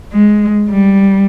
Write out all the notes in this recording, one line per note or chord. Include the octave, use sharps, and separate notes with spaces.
G#3
G3